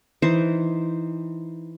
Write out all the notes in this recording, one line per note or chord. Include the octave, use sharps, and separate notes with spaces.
E3 D#4 C5